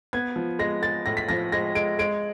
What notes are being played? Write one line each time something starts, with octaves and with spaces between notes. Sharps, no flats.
B3 G#6
F3
G#3 A#6
G#3 A6
A2 A#6
B6
F3 A#6
G#3 A#6
G#3 D7
G#3 D7